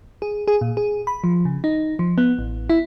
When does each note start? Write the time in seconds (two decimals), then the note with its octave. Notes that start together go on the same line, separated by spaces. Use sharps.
0.22 G#4
0.48 G#4
0.61 A#2
0.77 G#4
1.07 B5
1.24 F3
1.45 C#3
1.64 D#4
1.99 F3
2.18 B3
2.39 A1
2.70 E4